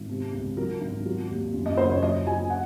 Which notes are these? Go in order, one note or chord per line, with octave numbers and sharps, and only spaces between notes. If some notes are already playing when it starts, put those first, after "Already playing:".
Already playing: G#1
C3
C#2
F#3 A#4
G#1
F#3
D#2
F#2
D#5
F#1 C5
C#5
F#3 D#5
F#3 G#5
F#5